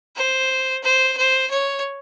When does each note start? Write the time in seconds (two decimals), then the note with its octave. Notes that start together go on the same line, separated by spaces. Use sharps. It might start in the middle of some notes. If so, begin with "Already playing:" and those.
0.16 C5
0.83 C5
1.17 C5
1.50 C#5